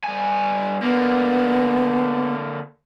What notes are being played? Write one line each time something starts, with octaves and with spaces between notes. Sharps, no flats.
G2 G#5
D3 A#3 B3